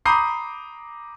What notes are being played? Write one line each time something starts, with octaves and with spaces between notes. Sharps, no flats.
A#5 B5 D6 D#6 G6 C7